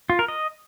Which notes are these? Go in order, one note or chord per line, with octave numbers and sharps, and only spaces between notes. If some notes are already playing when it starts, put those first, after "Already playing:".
F4
A#4
D#5